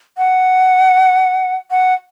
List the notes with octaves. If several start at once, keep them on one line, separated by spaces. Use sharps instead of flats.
F#5
F#5